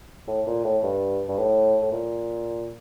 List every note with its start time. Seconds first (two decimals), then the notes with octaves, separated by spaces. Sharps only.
0.28 A2
0.47 A#2
0.64 A2
0.83 G2
1.28 G2
1.38 A2
1.82 A2
1.92 A#2